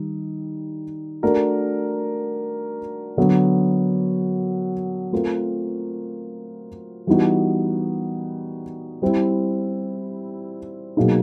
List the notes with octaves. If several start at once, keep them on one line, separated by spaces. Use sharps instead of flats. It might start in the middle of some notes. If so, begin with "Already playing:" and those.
Already playing: D#3 G3 D#4
A3 D4 F#4 A#4
D3 F#3 B3
A3 C4 F4 A#4
E3 G3 B3 D#4 F#4
G3 C4 E4
B2 F#3 A#3 D#4 G#4